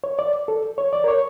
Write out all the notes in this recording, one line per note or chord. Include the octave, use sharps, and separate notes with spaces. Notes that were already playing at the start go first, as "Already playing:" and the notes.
C#5
D5
A4
C#5
D5
A#4
C#5